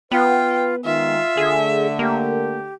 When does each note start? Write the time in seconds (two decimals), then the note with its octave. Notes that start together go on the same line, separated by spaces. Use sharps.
0.12 B3 F4 B4 G5
0.85 D#3 G#3 F4 E5
1.37 D3 A3 G#4
1.99 A#3 G4